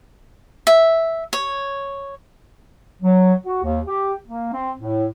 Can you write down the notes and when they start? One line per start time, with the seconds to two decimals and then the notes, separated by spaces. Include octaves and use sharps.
0.67 E5
1.33 C#5
3.02 F#3
3.44 F#4
3.63 D#2
3.87 G4
4.27 A#3
4.52 C4
4.79 A2